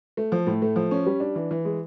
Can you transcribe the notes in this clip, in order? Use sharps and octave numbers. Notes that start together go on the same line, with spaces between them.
A3
F3
A2
A3
F3
C#4
G3
D4
E3
E3
G#3